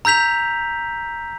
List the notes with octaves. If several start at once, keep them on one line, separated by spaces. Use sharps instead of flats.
A#5 E6 G6 B6 F7